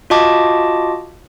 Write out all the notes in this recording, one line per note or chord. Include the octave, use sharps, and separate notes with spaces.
F4 F#4 D#5 A5 D6